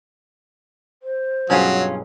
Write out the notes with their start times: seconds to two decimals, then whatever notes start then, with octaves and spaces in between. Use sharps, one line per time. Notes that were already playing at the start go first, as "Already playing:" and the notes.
1.03 C5
1.50 B1 G2 F#3 C#4 F4 G#4